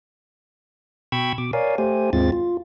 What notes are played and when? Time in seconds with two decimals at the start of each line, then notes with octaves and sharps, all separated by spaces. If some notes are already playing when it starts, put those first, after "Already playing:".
1.12 B2 G5 B5 C#6 E6 G#6
1.38 B2 D6
1.53 A#4 C#5 D5 F5 G#5
1.78 A3 G4 C5 G#5
2.13 D#2 G#2 G#3 C4 F4 A6
2.32 F4